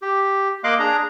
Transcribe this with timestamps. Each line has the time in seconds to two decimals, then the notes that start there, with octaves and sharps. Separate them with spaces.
0.02 G4
0.64 A#3 D#5 F5 C6 D6 F#6
0.79 D4 G#4 A#5